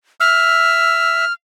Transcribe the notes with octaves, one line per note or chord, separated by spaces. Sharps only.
E5 E6 F6